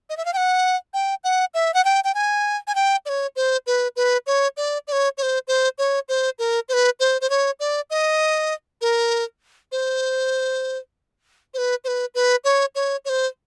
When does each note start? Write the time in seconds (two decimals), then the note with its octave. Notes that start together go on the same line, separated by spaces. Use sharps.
0.10 D#5
0.17 E5
0.25 F5
0.33 G5
0.37 F#5
0.94 G5
1.24 F#5
1.54 E5
1.74 F#5
1.85 G5
2.04 G5
2.15 G#5
2.67 G#5
2.75 G5
3.06 D5
3.09 C#5
3.36 C5
3.67 B4
3.96 B4
4.27 C#5
4.57 D5
4.88 D5
4.92 C#5
5.18 C#5
5.22 C5
5.48 C5
5.78 C#5
6.09 C5
6.39 A#4
6.69 C5
6.73 B4
7.00 C5
7.21 C5
7.30 C#5
7.60 D5
7.90 D#5
8.81 A#4
9.72 C5
11.54 C5
11.58 B4
11.84 C5
11.88 B4
12.15 B4
12.44 C#5
12.75 C#5
13.05 C#5
13.09 C5